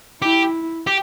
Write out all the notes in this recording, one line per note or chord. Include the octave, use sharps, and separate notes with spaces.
E4 G4
G4